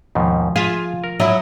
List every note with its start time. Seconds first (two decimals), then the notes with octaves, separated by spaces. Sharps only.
0.15 D#2 G#2 B2 F3
0.56 F4 G#4 E5 G#5
1.04 A#4
1.20 F#3 E4 D#5 E5 A#5